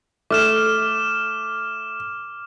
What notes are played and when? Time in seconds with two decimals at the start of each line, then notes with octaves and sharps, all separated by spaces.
0.31 A3 D6 F6 E7